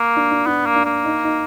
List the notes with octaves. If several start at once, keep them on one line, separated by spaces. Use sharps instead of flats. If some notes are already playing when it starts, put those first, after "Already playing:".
Already playing: A#3
D4
D4
B3 D4
A#3
D4
A#3
D#4
D#4